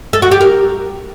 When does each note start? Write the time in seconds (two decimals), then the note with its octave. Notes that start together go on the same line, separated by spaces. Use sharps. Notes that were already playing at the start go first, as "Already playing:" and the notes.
0.13 A4
0.22 F#4
0.31 G4
0.41 A#4